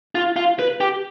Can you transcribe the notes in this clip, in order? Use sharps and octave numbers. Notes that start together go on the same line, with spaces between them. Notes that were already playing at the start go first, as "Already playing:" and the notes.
F4
F4
B4
G4